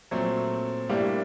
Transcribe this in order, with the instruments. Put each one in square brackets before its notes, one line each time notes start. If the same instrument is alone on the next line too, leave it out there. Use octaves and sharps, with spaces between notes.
[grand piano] A#2 A3 C4 [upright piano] F#3
[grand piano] A2 A3 D4 [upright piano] G3 A#3